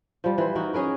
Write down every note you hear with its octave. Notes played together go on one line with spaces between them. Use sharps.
F3 G3
E3 C5
D#4 F#4 A#4
C#4 G#4 A#4 B4